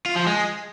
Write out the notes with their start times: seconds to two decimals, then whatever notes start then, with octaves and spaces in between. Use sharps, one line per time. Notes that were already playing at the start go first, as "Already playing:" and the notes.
0.06 F4
0.16 F3
0.26 G#3